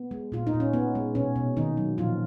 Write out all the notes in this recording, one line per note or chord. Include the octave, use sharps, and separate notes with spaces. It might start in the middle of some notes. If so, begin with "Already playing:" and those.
Already playing: B3
G#3
A#2 F4
D#4
A#2
C#4
B3
G#3
B2 C#4
B2
D#3 A#3 D#4
F#3
A#2 F3 F4